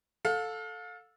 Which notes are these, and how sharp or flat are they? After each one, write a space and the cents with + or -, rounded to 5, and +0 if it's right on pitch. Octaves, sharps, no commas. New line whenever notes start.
A4 +0 F5 +35